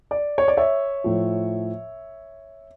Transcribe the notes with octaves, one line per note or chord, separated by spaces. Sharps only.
D5
C#5
D5
C#5 E5
A2 F3